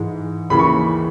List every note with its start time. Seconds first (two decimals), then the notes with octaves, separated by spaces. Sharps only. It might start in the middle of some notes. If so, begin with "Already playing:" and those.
Already playing: G#2 E3 G#3
0.50 D#2 C#3 E3 B5
0.59 C#6